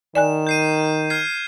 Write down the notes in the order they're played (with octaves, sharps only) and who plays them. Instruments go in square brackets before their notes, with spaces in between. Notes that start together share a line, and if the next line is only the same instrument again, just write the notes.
[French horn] D#3 [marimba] D5 G#5 F#6 [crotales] E7
[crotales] G6 C7 D#7
F6 G#6 C7